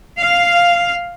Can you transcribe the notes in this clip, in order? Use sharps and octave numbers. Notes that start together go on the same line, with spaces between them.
F5